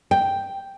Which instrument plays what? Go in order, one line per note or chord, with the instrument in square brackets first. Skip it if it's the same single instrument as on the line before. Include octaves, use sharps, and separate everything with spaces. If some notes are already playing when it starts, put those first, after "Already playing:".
[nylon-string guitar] G5